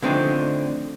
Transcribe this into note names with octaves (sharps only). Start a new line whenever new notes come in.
D3 F3 A3 C4 D4 D#4